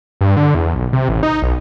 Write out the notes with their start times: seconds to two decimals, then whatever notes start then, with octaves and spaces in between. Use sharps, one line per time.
0.21 G2
0.37 D3
0.54 E2
0.75 B1
0.93 C3
1.09 A1
1.23 D#4
1.42 B1